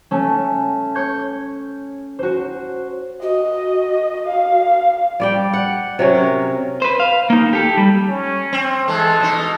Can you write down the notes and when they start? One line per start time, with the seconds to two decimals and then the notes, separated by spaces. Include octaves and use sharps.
0.11 A3 C#4
0.95 C#5 C#6 G6 G#6
2.19 F#4 C5
3.22 F#4 D#5
4.27 F5
5.20 G3 D5 G5
5.53 F#5
5.99 C3 F#3 C#4
6.15 A#4
6.82 B4 C5
7.00 F5
7.30 A#3 D#4
7.53 G4 A4
7.77 G3
8.09 C#4
8.53 C4
8.88 E3 G#3 A4
9.20 B2 D#4